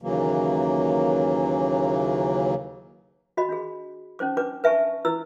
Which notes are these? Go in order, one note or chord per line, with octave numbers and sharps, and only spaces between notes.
D#2 C#3 E3 F#3 A#3
F#4 D#5 B5
D4 F#4 G#4
C#4 D#4 C5 D6
D4 B4 D6
B4 E5 G#5 A5 C#6
E4 B4 E6